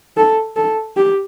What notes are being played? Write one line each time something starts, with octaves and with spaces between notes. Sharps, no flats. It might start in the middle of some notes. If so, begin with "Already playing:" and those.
A4
A4
G4